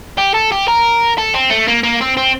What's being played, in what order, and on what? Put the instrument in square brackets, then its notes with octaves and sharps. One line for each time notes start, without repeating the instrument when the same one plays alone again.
[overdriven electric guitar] G4
A4
G4
A#4
A4
C4
A3
A#3
A#3
C4
C4